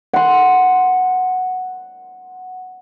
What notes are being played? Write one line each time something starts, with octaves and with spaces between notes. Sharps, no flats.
F#5 C6